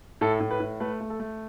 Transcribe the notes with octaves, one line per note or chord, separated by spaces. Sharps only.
A2 A4
A2
B4
A2
A3 B4
A3
A4
A3